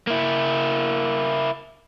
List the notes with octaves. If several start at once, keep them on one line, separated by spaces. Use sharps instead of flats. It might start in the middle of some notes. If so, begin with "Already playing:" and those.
A#3 E4